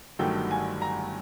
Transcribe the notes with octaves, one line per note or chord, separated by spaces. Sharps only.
G1 G2 D#3 F#3 A3 G5
G#5
A#5